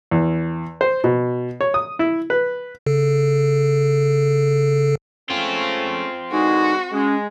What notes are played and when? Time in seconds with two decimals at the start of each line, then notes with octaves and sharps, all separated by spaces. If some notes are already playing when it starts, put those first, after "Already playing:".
0.11 E2
0.81 C5
1.04 B2
1.61 C#5
1.74 D#6
1.99 E4
2.30 B4
2.86 C#3 A4
5.30 G#3 A3 C4 C#4 F4
6.31 D3 E3 G#3 D#4 F#4
6.92 G#3 C#4